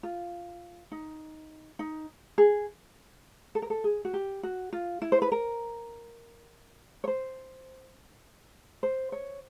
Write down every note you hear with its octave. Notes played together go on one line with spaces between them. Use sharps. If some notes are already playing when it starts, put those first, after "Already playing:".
F4
D#4
D#4
G#4
A4
A#4
A4
G#4
F#4
G4
F#4
F4
E4
C5
B4
A#4
C#5
C5
C5
C#5